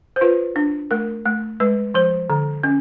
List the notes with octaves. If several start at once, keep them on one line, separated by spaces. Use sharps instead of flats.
C5
F4 B4
D4
A3 A#4
A3
G#3 B4
F3 C5
D3
C#4